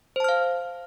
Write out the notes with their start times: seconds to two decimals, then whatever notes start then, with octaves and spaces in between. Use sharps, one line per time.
0.16 C5
0.20 A5
0.24 F6
0.29 F5